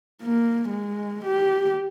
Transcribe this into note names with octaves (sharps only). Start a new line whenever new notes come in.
A#3
G#3
G4